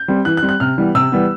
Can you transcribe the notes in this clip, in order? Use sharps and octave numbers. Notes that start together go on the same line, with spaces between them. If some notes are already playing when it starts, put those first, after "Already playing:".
Already playing: G6
G3 C4
E3 F#6
F#6
G3 C4
F#6
C3 F6
E3 G3 B3
C3 E6
E3 G3 B3